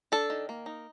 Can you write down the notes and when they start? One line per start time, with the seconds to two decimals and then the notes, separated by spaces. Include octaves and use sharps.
0.12 D4 A4
0.30 D#3
0.49 A#3
0.66 D#4